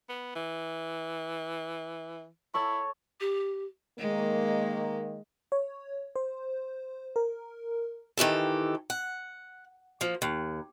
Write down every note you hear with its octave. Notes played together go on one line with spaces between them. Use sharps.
B3
E3
E4 A4 C#5 C#6
G4
D#3 G#3 A#3
C#5
C5
A#4
D#3 E3 G4 A4
F#5
F3 A#3
D#2